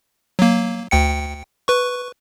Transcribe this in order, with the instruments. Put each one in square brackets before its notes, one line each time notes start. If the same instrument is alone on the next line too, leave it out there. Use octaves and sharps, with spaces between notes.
[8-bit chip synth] F#3 A#3
D2 G5 C#7
B4 C#6